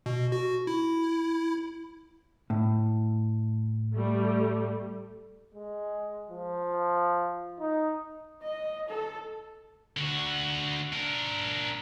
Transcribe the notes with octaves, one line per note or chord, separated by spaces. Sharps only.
B2
F#4
E4
A2
G3 A3
G#3
F3
D#4
D#5
A4
D3 F#4
D4 A#4